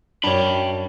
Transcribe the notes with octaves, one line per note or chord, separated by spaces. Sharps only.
F#2 D4 C#5 G5 B5